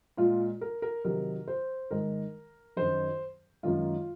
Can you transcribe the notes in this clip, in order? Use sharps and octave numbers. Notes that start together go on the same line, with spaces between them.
A#2 G#3 F4
A#4
A#4
C3 D#3 F#3 A#4
C5
G#2 D#3 G#3 A#4
F#2 D#3 F#3 C5
F#2 D#3 G#3 F4